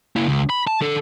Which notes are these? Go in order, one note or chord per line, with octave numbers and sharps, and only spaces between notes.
A#3 E4
C#2
B5
A5
D3 A4